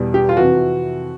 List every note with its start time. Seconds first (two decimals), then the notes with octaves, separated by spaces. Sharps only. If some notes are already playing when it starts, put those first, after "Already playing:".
Already playing: E2 B2 G3
0.14 G4
0.29 F4
0.37 F2 C3 E3 F#4